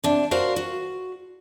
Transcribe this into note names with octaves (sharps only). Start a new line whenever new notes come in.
C3 D4
F#4 A#4 C5 D5 F5
F#4